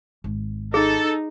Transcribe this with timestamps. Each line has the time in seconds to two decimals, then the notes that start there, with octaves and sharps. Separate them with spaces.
0.24 G#1
0.74 D#4 G#4 A4